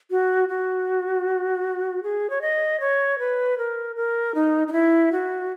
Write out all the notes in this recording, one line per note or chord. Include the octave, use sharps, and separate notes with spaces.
F#4
F#4
G#4
C#5
D#5
C#5
B4
A#4
A#4
D#4
D#4
E4
F#4